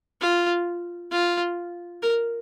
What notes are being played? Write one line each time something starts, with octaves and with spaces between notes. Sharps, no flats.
F4
F4
A#4